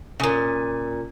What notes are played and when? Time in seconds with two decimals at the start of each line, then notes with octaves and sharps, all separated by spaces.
0.20 A#2 C#3 C#4 G#5 D#6